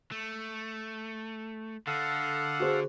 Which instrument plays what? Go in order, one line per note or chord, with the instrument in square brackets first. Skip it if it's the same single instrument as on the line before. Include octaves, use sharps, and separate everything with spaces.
[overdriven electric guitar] A3
[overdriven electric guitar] D3 [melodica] A4 F5 F#5
[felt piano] F#4 G#4 C5